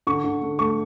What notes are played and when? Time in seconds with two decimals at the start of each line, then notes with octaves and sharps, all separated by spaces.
0.07 D3 C#6
0.24 D3
0.42 D3
0.59 A3 C#6